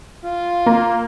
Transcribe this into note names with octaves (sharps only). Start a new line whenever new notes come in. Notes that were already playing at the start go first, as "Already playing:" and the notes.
F4
A#3